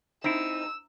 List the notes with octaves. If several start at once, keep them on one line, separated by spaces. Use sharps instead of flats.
C4 D#4 E4 E6